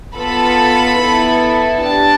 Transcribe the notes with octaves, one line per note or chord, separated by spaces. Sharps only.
B3 F4 A4 B5
B3 E4 A4
D4 G4 A5